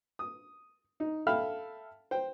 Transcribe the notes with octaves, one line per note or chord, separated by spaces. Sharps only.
D#6
D#4
A4 E5 F5 G5 B5 F6
C5 G5